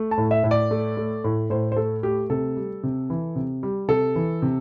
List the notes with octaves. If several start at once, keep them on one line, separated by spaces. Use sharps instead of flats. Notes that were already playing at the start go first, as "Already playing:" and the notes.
Already playing: A3
A5
A2
E5
A2
D5
A3
A3
A2
A2 C5
C5
A3 A4
A3 G4
C3 A4
G3
C3
E3
C3
G3
C3 A4
E3
C3